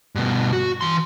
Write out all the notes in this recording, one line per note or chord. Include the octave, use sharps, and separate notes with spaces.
G2 B2
F#4
E3 C6